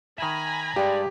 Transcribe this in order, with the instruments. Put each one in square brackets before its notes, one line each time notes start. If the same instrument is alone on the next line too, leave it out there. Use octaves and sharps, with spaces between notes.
[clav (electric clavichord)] D#3 E5 [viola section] G#5 A#5 B5
[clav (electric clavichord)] G2 G#3 [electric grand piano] G4 [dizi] D5